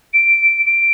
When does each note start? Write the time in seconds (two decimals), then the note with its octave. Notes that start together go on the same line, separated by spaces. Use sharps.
0.13 D7
0.65 D7